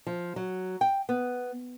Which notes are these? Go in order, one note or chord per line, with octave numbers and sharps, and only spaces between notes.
F3
F#3
G5
B3